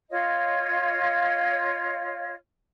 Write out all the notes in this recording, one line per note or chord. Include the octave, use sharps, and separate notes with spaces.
F4 C#5 D#5